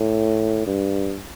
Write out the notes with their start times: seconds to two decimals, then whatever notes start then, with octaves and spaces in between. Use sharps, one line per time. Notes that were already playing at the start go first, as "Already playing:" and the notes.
Already playing: A2
0.67 G2